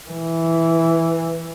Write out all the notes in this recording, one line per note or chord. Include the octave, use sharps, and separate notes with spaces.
E3